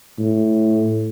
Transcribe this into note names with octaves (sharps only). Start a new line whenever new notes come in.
A2